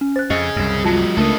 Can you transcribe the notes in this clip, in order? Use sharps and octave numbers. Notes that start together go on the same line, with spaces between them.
C#4
C5 F#6 A6
F2 G#4 C#5 D#5
C2 F#2
F#3 G#3 F4 A5
C#2 A3 D4 A4 A#4 D#5